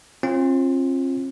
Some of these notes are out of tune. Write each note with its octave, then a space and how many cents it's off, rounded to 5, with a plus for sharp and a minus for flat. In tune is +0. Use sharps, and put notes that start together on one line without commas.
C4 +45 F4 -5